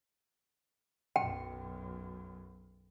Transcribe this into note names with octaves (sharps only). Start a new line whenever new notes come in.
B1 F#2 G5